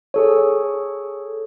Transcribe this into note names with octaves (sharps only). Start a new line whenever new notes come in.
G#4 A4 C#5